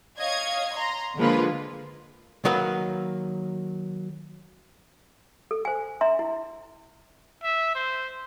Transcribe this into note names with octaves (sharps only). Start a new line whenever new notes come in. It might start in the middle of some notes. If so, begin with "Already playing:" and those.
C#5 D#5 F5 G#6
A#5 C6
D3 F3 G#3 A#3 F4 B4
D#3 F#3 A#3 B4
A4
C5 G#5
D4 E5 A#5 C6
E4
E5
C5